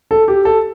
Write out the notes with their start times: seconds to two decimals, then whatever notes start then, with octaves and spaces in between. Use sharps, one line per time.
0.11 A4
0.28 G4
0.45 A4